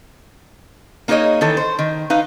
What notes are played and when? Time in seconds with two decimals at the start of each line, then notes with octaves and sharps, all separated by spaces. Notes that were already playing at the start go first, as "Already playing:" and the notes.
1.08 A#3 D#4 G#4 A#4 C#5 D#5
1.41 D#3 E3 A4
1.57 C5
1.79 D#3
2.10 D#4 B4 F5